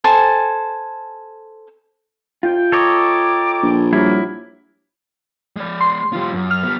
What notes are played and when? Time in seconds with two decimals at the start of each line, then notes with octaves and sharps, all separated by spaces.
0.04 A4 C5 G#5 A5
2.43 F2 C3 F4 G5
2.72 A4 C#5 D#5 G5 A#5 D6
3.62 A#1
3.93 F#3 G3 A#3 E4
5.56 G#3 D5
5.81 C6
6.13 G3 F4
6.32 F#2
6.51 F6
6.63 G3 B3